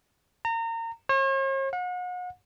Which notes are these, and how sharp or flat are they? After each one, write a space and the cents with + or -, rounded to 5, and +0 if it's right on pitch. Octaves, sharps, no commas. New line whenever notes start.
A#5 -30
C#5 -45
F#5 -40